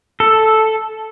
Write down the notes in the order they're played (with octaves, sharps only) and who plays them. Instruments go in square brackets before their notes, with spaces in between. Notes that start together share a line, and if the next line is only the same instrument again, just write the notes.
[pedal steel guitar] A4